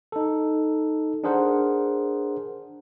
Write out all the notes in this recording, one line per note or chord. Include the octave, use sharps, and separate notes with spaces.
D#4 A4
D4 G#4 A#4 C5 F#5